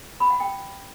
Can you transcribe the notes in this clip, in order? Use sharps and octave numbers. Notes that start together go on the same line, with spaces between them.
B5
F#5
G5